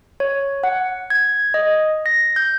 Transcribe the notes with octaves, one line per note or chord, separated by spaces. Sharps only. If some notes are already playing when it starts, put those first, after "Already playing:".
C#5
F#5
G#6
D#5
A#6
G6